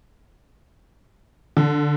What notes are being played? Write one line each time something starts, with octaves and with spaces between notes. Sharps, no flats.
D3